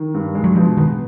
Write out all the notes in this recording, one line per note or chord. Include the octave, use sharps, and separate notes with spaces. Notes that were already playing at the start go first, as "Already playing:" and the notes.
Already playing: D#3
G2
G#3
F#3
B2 F3
D#3 B3